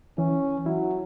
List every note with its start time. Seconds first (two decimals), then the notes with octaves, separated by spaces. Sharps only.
0.18 E3 C#4
0.66 F#3 E4